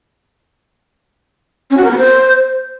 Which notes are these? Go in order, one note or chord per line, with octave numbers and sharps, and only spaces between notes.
C#4
F#4
A#4
B3
C5